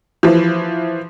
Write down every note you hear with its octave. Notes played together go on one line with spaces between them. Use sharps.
E3 F3